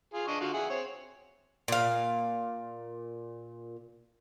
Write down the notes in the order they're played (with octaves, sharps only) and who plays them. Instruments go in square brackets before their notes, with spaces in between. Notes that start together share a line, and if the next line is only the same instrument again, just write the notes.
[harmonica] F4 G#4
D4 D#5 C#6
D3 F4 F#4
G#4 E5 F#5
C4 C#5
[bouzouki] A#2 F5